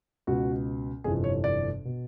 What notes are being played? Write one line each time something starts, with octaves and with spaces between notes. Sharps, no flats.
C#2 B2 F#4
G1 F2 C3 E3 G#4
C#5
D5
B2